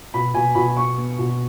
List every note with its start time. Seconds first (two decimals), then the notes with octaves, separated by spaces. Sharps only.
0.14 B2 B5
0.34 B2 G#5
0.55 B2 B5
0.77 B3 C#6
0.98 B3
1.19 B2